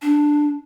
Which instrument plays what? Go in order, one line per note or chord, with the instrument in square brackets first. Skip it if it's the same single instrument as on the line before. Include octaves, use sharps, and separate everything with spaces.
[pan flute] D4